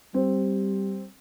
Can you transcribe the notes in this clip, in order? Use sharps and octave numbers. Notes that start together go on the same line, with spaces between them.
G3 C4